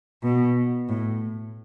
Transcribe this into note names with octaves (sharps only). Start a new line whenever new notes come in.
B2
A2